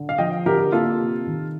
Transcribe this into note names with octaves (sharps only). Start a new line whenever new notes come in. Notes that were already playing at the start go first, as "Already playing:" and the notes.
Already playing: D3
F5
F3 D#5 G5
D3 G4 A#4
A#3 F4 A4
C3
D#3